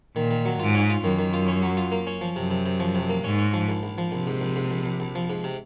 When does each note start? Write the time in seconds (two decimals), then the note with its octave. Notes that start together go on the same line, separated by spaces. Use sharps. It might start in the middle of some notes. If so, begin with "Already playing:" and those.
0.16 A#2 D#3
0.31 D#3
0.45 F#3
0.60 G#2 F4
0.75 C#4
0.90 F4
1.04 F#2 D#3
1.19 D#3
1.33 F4
1.48 C#4
1.62 F#3
1.77 F4
1.92 A#3
2.07 C#4
2.21 F3
2.36 F#2 C3
2.51 C3
2.66 C3
2.80 F3
2.95 C3
3.10 A#3
3.24 G#2 C#4
3.38 C#4
3.53 F3
3.69 A#1
3.83 A#1
3.98 F3
4.12 A#1 C3
4.27 G#2
4.41 A#1
4.56 G#2
4.71 A#1
4.86 A#1
5.00 A#1
5.15 F3
5.30 G#2
5.44 C3